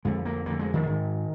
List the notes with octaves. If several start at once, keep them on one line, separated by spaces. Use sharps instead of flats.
F2 D3 G#3
A#3
F2 D3 A#3
G#3
D#3
G#2 D#3